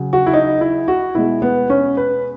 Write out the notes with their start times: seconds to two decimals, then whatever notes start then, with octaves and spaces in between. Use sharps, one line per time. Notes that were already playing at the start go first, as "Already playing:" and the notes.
Already playing: C#3 F#3
0.13 F#4
0.26 E4
0.33 D#4
0.61 E4
0.88 F#4
1.15 B2 G#3 E4
1.42 B3
1.70 C#4
1.97 B4